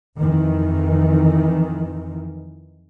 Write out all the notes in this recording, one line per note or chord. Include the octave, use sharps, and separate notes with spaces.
F2 D#3 E3